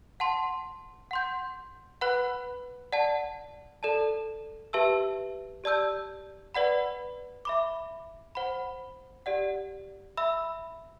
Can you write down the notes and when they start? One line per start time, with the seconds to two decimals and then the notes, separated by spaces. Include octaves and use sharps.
0.20 F#5 A5 C6
1.11 F#5 C6 G6
2.01 B4 F#5 B5 F#6
2.92 D5 F#5 A5
3.83 A4 D5 A5
4.73 G4 B4 E5 A5 E6
5.64 G4 D5 A5 E6 G6
6.55 B4 D5 F#5 B5
7.45 E5 B5 D6
8.35 C5 F#5 B5
9.26 G4 D5 F#5
10.17 E5 B5 E6